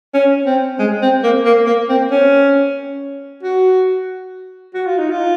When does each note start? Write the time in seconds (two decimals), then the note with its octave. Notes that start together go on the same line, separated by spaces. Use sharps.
0.14 C#4
0.46 C4
0.79 G#3
1.02 C4
1.23 A#3
1.46 A#3
1.67 A#3
1.89 C4
2.11 C#4
3.43 F#4
4.74 F#4
4.86 F4
4.98 D#4
5.11 F4